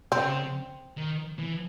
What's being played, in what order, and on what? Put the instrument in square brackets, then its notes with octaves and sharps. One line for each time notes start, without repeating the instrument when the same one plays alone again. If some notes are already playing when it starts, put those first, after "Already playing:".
[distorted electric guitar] C#3 [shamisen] C4
[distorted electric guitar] D#3
E3